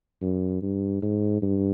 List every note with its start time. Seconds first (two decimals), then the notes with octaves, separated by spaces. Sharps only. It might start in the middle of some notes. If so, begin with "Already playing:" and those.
0.22 F#2
0.62 G2
1.02 G#2
1.42 G2